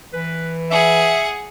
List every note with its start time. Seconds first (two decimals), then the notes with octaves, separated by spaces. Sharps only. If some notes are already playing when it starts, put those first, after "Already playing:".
0.13 E3 B4
0.71 G#4 E5 F#5